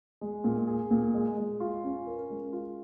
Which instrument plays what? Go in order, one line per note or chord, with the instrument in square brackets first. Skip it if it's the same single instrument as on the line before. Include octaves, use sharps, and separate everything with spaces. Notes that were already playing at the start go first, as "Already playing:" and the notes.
[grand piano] G#3
A#2
G#4
A#2
G#3
G#3
F4
C#4
A#4
G#3
F4